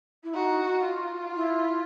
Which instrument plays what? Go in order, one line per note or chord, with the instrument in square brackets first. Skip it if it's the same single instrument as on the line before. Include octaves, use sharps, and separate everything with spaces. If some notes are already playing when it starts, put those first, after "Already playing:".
[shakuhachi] E4
[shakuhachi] D#4 [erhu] F#4
[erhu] F4
[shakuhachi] E4